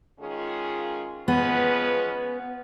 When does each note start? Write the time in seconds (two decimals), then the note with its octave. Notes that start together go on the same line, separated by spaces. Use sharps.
0.20 D#3 G#3 C#4 F4 G#4
1.28 F3 G#3 B3 C#4 G#4 B4